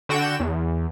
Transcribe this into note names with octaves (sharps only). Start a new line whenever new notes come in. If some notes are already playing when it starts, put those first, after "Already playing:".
D3 F#4 G5 E7
E2